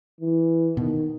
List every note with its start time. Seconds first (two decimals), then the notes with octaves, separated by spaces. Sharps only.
0.21 E3
0.77 B2 D#3